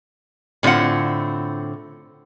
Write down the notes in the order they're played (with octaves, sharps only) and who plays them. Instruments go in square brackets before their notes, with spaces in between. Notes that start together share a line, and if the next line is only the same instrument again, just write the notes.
[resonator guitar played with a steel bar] A2 D3 C4 F4 F#5